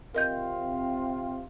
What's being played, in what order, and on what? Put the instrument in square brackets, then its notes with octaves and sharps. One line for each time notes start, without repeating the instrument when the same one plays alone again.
[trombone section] C3 C4 F4 [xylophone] A#4 D#5 G6